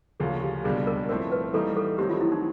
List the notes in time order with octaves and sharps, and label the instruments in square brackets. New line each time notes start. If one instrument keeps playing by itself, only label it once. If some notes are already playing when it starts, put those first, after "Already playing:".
[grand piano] D2 C#3 F3 A#3 C#4 [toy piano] G#4
[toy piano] G4
[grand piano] C#2 B2 G3 A#3 D4 [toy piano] G#4
[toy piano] A#4
[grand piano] A2 F3 A3 C4 E4 [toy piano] A#4
[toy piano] B4
[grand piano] E3 G3 A#3 D#4 [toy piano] A4
[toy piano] A4
[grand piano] D#3 F#3 A3 C4 [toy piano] G4
[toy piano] F4
E4
D#4